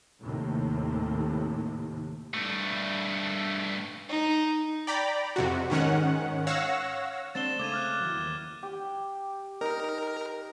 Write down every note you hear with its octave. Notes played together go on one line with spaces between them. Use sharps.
D#2 A2 C3
G2 A3
D#4
D5 G5 A#5 B5
F2 C3 F#4
G#2 D#3 C#4 F#5
C#5 F5 F#5 E6 A#6
G#3 C4 D4 A6 E7 G7
C#3 A3 C4 D6 G#6 D#7
D6 F6 F#6
E3 F#3
D#2
G4
D#4 A#4